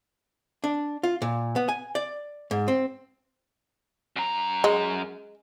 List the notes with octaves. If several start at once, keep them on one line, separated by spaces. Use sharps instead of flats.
D4
F4
A#2
B3
G#5
D5
G#2
C4
F#2 A#5
G#3